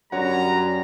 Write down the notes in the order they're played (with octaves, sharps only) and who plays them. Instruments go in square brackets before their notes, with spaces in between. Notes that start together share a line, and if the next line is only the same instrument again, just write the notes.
[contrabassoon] F#2 [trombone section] D3 G3 [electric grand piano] C#5 F#5 [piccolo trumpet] A#5